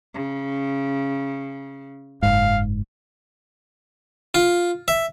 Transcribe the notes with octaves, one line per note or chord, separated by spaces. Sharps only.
C#3
F#1 G#2 F5
F4
E5